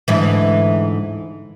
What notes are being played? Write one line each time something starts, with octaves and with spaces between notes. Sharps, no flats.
D2 G#2 E3